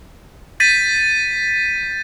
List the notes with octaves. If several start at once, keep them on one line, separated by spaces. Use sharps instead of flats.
G6 A6 B6 D#7